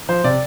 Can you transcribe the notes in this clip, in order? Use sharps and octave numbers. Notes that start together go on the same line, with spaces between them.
F3 C5
C3 D5